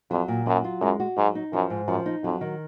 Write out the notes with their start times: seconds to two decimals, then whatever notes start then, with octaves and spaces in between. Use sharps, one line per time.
0.11 F2 F#3
0.28 A#2
0.46 F#2 F#3
0.64 F4
0.81 F#2 G#3
1.00 F#4
1.17 G#2 F#3
1.35 D#4
1.53 F#2 F3
1.70 G#2
1.87 F#2 F3
2.06 D#4
2.24 F2 F#3
2.41 D#3